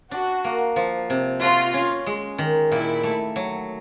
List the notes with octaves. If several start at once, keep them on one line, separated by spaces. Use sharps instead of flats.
D4 F#4
A#3
F3
C3
F4 F#4
C#4
G#3
D#3
A#2 E4
A3
F#3